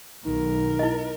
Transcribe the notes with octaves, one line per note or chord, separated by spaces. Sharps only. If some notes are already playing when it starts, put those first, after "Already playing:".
B1 D#3 A#4
E4 D#5